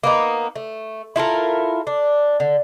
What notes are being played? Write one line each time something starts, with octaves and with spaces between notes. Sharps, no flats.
A#3 B3 D#4
A3
E4 F4 A4 A#4
D4
D3